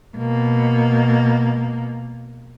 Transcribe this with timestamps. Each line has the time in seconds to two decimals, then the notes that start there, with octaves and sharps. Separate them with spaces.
0.17 B2 A#3